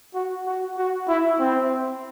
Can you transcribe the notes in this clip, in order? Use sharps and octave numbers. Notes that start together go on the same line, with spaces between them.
F#4
F#4
F#4
E4
C4